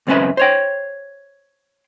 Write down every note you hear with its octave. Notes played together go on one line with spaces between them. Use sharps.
C#2 F#2 C4 C#4 B4 E5
C5 C#5 G5